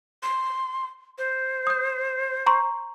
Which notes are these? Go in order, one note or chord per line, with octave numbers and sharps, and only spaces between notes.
C6
C5
D#6 G6
A#5 C6 C#6